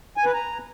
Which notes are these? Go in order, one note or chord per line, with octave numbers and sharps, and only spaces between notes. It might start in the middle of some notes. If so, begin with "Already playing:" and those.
G#5
B4
A#5